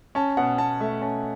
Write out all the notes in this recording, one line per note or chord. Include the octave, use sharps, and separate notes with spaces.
C#4 A5
B2 F#5
B2 A5
A3 E5
C#4 A5